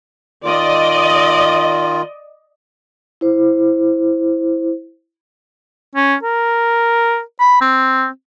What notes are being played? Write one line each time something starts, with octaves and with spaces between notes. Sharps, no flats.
D#3 F4 D5 D#5
E4 C5
C#4
A#4
B5
C4